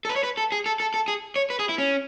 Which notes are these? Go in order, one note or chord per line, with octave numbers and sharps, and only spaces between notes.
A4
B4
C#5
B4
A4
G#4
A4
A4
A4
G#4
C#5
B4
G#4
E4
C#4